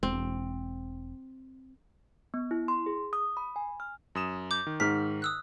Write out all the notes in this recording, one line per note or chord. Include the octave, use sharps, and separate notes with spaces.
E1 C4
B3
E4
C6
G#4
D#6
B5
G#5
F6
F#2 D#6 E7
D6 G6
D#3
G#2 F6 B6
D#6 E6 F#6